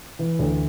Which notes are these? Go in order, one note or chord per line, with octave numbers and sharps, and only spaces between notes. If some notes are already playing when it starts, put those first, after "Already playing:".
E3
D2